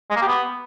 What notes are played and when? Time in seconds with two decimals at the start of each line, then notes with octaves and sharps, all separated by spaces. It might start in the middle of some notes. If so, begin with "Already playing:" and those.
0.10 G#3
0.16 A#3
0.22 G4
0.27 B3